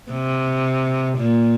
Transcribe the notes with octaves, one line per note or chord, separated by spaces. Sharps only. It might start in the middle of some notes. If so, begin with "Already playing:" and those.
C3
A#2